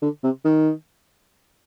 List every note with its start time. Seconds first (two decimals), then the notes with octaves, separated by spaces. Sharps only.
0.02 D3
0.24 C3
0.45 D#3